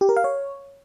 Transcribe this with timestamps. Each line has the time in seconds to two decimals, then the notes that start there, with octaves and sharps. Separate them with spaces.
0.01 G4
0.09 A#4
0.17 F5
0.24 C#5